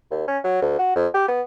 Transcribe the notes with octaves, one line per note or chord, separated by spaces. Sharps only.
D#2
C#4
F#3
D2
F#4
F2
G4
B3